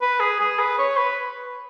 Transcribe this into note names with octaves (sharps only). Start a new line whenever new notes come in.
B4
G#4
G#4
B4
C#5
B4